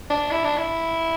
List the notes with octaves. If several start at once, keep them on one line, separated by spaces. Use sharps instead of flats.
D4
E4
D4
E4